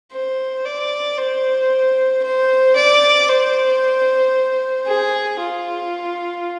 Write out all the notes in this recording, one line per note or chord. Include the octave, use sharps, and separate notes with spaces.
C5
D5
C5
C5
D5
C5
G#4
F4